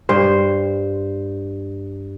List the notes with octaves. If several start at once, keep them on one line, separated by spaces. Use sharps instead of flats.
G2 C5